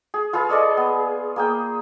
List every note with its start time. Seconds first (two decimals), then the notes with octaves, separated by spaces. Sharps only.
0.14 G#4
0.33 F4 G#4 B4 F5
0.49 G#4 D5 D#5 C#6
0.77 B3
1.36 A#3 G#4 G5